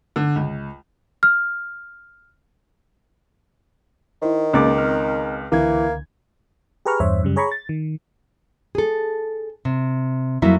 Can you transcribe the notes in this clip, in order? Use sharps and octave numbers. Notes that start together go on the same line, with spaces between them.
D3
C#2
F6
D#3 E4 C5
C#2 A#3 C#4 D6 A6
C4 F6
C#2 D3 E3 A#3 G#6
G4 G#4 B4 A#5 C#6 F6
E2 G2 C5 C#5 E5
F#2 C#3 G3
G#4 C#5 A#5 B5 C#6
A6
D#3
G#4 A4
C3
F2 F#3 A#3 E4 E5